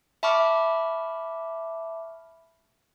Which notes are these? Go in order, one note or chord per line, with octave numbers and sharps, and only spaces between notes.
E5 A5 B5 C#6 D6 F6